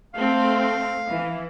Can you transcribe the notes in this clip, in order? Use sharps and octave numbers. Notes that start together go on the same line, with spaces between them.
A3 C4 F5
E3